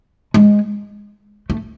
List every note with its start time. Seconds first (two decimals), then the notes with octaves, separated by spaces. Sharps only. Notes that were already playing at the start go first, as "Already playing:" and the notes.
0.34 G#3
1.50 A3